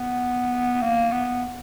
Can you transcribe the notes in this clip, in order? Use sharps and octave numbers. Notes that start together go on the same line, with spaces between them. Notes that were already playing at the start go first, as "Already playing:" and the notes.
Already playing: B3
A#3
B3